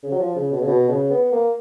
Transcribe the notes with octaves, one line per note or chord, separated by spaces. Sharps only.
C#3
F#3
F3
C#3
B2
C#3
B2
C#3
B3
A#3